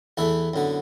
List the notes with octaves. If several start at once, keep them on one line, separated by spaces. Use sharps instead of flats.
E2 E3 A3 E4
F#2 D3 B3